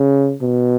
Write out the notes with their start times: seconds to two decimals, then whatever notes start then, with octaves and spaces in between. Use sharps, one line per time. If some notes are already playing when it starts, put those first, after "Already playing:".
Already playing: C#3
0.42 B2